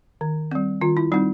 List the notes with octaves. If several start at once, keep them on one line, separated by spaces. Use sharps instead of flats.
D#3
G3 C4
D#3 F4
E4
G3 C4 D#4